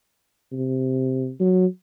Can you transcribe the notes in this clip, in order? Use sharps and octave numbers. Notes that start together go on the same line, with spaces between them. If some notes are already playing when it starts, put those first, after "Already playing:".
C3
F#3